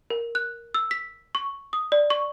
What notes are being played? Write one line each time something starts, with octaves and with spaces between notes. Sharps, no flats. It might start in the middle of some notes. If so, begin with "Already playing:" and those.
A#4
F#6
E6
B6
C#6
D#6
D5
C#6